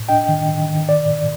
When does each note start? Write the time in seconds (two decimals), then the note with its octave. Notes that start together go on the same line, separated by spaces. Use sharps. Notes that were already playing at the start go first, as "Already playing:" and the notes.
Already playing: A2
0.09 D4 D#5 G5
0.29 D#3
0.49 D#3
0.69 D#3
0.89 D5